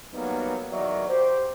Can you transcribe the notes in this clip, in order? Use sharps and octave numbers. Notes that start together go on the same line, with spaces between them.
F#3 G3 A#3 B3 D#4
E2 D#3 F#3 D5 E5
G4 C5